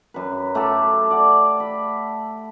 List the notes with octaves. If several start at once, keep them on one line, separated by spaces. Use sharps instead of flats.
F#2 B4
A3 G4 A4
D5 F#5
B5